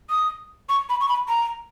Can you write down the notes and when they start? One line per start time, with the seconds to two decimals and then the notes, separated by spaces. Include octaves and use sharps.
0.10 D#6
0.69 C#6
0.90 B5
1.00 C#6
1.09 B5
1.29 A#5